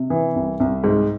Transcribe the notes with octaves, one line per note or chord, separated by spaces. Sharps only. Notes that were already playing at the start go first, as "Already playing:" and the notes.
Already playing: C3
E3
C2
C2
G#2